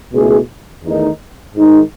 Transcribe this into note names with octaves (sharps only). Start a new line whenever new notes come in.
C#2 B2 A3 E4 G#4
E2 D#3 A3 D#4
G#2 D#3 G#3 D#4